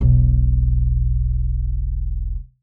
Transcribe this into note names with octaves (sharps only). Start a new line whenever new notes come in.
E1 B1